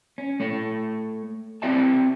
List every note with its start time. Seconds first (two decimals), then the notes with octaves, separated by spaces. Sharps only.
0.18 C#4
0.40 A3 C#5
1.62 C4 G4 D5 E5 A5